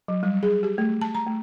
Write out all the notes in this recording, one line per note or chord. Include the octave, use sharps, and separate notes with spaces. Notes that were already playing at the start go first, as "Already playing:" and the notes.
F#3
G3
G#4
G4
A3
A5
A#5
A3